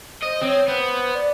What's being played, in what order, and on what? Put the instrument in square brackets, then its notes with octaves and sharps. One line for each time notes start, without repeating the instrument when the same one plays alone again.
[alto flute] C5 [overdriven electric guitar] D#5
[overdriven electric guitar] C4 [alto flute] C#5
[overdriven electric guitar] B3 [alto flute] C5
[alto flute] D5